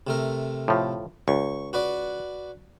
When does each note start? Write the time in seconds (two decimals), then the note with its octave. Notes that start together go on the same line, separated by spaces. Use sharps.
0.07 C3 A3 A#4
0.68 A2 F3
1.28 C#2 C#6
1.73 F#4 B4 D5